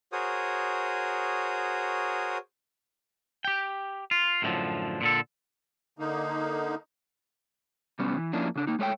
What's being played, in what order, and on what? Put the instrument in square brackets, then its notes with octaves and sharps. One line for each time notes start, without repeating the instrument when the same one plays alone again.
[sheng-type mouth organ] F#4 G#4 A#4 C5 C#5 D#6
[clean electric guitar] G4 G5
F4
F#2 A2 D3 D#3 F3
A#2 D3 A4
[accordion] D3 A#3 D#4
[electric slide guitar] C3 G3 B3 C#4
E3
F3 A#3 C#4 D4 E4
C#3 D4
A#3 D#4
G#3 A3 C#5 E5 G5